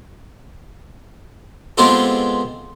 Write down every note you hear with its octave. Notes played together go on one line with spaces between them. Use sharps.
G#3 B3 C4 F4 G4 A4